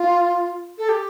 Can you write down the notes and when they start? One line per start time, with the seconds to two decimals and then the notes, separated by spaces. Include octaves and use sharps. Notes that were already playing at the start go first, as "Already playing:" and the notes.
Already playing: F4
0.78 A4
0.89 G4